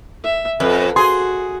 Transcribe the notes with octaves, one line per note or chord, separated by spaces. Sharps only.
E5
F2 A4 B4
F#4 G#4 C6